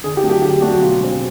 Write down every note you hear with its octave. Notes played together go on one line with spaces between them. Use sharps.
D3 G#4
G4
F#3 A3 D4
G4
D3 G4
F#3 A3 D4 F#4
B2 F4
G#3 C4